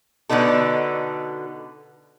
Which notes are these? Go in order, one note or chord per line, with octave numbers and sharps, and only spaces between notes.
B2 D3 B3 D#4 A4